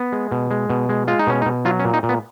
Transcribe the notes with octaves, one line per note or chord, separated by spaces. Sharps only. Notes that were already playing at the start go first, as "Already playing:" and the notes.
Already playing: B3
G#3
B2
G#3
B2
G#3
G#3 F4
D#4
B2 C#4
D#4
B2
F#3 F4
C#4
A#2
D#4
A#2
B3